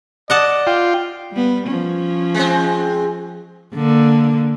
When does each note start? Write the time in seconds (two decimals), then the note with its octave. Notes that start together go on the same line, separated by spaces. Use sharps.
0.30 D5 D#5 F#5 A5
0.67 F4 G5
1.32 G3 B3
1.67 F3 C#4
2.34 G#3 C4
3.75 D3 A#3